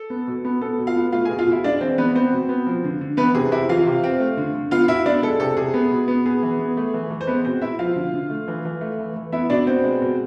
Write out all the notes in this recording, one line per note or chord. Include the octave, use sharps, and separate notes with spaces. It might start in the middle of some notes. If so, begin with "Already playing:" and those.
Already playing: A4
B3
B2
B3
B3 A4
B2
F4 F5
B3
A3 F4 F5
G#4 G#5
B2
F4 F5
B2 E4 E5
G#3 D4 D5
E3 C4 C5
E3 B3 B4
B3 C4 C5
B2
B3
F3
D3
D3
E3 B3 B4
C3 G#4
C3 E4 E5
E3 F4 F5
C3
C4
A3
D3
D3
B3 F4 F5
B2 E4 E5
B3 D4 D5
G#3 A4
C3 A4
C3 G#4
B3
B2
B3
B3 G#4
E3
B3
A3
E3
E3
C5
G#3 B3 B4
B2 C4 C5
B2 E4 E5
F3 F4 F5
D3
D3
A3
E3
E3
A3
E3
E3
B3 E4 E5
B2 D4 D5
B3 C4 C5
G#3
B2